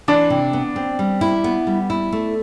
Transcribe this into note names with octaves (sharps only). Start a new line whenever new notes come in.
E3 D4
C3
B3
C4
G3
E4
B3
G3
E4
A3